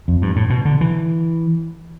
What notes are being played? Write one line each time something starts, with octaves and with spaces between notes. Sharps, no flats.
F2
G2
A2
B2
D3
E3